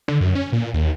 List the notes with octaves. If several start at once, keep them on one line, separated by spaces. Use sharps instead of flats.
D3
F#2
C#4
A#2
D#2